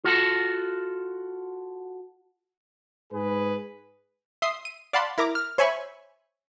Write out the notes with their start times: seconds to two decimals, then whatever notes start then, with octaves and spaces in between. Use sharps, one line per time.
0.04 F4 F#4 A4
3.12 G#2 G#4 B4
4.42 E5 C6 D#6 C7
4.65 D#7
4.93 D5 F5 F#5 A5 B5 C6
5.18 E4 A#4 A#5 D6
5.35 F6
5.58 C5 C#5 E5 G#5 B5 C#6